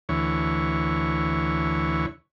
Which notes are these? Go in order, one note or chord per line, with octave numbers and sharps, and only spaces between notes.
D2 E3 C#5